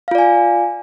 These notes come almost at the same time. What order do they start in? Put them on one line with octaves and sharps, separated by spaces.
F5 F4 D5 G#5